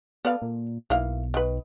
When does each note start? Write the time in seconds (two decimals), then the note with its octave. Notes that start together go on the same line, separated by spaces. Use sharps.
0.25 B3 A4 D5 F5
0.42 A#2
0.90 B1 A#3 E4 F5
1.34 D#3 B4